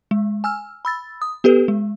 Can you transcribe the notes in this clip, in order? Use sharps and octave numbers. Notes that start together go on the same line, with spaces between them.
G#3
G#5 E6 F6
B5 E6 A6
D#6
B3 G4 A4 B4
G#3